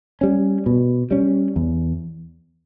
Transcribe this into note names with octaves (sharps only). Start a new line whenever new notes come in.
G3 C#4
B2
G3 C#4
E2